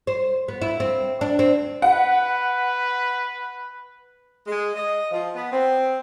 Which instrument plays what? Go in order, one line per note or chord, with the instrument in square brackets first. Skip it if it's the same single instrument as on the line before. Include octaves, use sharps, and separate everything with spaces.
[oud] C5
B3
E4
C4
D4
C4
[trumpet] B4 [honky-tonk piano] F#5
[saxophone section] G#3
D#5
F3
B3
C4